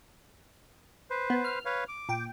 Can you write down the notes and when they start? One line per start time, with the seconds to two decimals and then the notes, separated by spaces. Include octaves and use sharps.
1.10 B4 C5
1.30 B3
1.44 F6
1.65 B4 C#5 F5
1.88 D6
2.09 A#2 G5